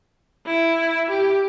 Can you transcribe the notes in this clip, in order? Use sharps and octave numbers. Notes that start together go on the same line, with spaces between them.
E4
G4